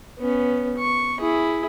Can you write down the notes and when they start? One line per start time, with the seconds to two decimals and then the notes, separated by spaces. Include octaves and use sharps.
0.18 B3 C#4
0.78 C#6
1.20 E4 G#4